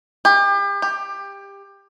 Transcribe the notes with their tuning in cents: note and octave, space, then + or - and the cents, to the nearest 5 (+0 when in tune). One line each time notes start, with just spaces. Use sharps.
G4 +35
G4 +20